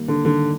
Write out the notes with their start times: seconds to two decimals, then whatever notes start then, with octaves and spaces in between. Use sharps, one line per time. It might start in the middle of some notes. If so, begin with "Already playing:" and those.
Already playing: D#3 G3 A#3
0.08 D3
0.25 D3 D#3 G3 A#3